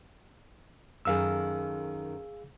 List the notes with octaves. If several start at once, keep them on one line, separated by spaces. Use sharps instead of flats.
F#2 D#3 G#4 A4 F5 E6